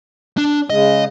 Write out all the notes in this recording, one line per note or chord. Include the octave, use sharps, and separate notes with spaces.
D4
C#3 G#3 D#5